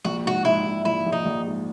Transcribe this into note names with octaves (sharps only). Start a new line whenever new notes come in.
A#1 F#4
G#2 F#4
G#2 E4
G#2
A#1 E4
A#1
D#4
A#1
G#2